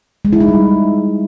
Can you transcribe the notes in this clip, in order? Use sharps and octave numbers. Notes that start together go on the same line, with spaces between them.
G#3
E4
D#4
G3